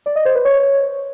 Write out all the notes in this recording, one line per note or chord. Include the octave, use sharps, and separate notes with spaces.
D5
D#5
C5
B4
C#5